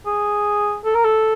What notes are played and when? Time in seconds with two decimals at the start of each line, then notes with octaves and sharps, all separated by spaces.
0.06 G#4
0.84 A4
0.94 A#4
1.04 A4